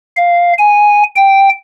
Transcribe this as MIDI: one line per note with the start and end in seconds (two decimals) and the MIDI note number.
0.17 0.53 77
0.59 1.03 80
1.16 1.49 79